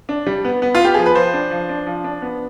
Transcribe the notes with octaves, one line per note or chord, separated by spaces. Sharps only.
D4
G3
B3
B3
F4
B3 G4
F3 G#4
B4
F3 C5
D4
F3
D4
F3
D4
B3